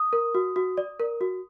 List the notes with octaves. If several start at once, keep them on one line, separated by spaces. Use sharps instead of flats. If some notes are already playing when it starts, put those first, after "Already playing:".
Already playing: D#6
A#4
F#4
F#4
D5
A#4
F#4